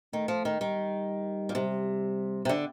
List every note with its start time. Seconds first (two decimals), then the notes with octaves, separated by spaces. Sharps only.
0.13 D#3 A3
0.28 F3
0.45 D#3
0.60 D#3 G3
1.49 A#2
1.55 C3 G3
2.45 C3
2.49 D3